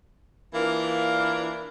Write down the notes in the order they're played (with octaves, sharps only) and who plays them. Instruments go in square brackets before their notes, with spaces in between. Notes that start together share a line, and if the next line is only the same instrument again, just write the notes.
[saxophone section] E3 A#3 D4 F4